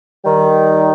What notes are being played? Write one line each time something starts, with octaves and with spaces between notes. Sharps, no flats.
D#3 G3